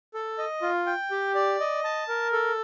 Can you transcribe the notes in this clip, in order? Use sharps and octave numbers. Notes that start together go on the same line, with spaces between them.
A4
D#5
F4
G5
G4
D5
D#5
A5
A#4
A4